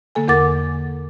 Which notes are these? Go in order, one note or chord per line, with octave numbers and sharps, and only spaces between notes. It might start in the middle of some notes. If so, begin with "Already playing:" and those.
D3 A#3 A4 G#5
E2 D3 A#4 F#5 D6 A6